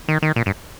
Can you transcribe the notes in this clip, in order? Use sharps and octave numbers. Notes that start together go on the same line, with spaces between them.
D#3
D#3
A#2
G2